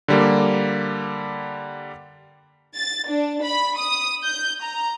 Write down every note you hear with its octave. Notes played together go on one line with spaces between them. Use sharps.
D3 G3 A#3
A6
D4
B5
D#6
G6
A#5